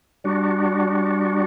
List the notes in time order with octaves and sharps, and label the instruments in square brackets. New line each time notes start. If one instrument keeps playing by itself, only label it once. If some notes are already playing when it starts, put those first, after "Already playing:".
[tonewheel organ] G3 D4 F#4